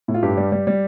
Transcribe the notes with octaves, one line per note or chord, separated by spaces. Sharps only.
A2
F4
G2 G4
G3
G3
G3